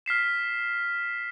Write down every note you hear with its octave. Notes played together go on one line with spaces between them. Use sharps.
F6 B6 C7 E7